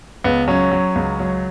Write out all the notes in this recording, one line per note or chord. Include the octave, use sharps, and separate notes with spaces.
C#2 B3
F#3 C#4
F#3
C#2
F#3